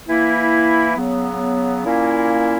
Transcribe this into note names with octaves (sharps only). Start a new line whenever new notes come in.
E3 A#3 E4
C#3 F#3 B3
A#2 A#3 C#4 E4